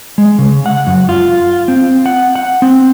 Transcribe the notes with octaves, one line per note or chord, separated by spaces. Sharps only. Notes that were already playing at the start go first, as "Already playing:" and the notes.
G#3
C#3
F#5
F#2
F4
C4
F#5
F#5
C4